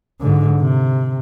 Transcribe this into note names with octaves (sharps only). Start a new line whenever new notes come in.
G#2 D3
C3